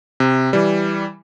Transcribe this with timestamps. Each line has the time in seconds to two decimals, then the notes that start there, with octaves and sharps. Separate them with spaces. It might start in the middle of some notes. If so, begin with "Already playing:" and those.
0.20 C3
0.53 E3 G3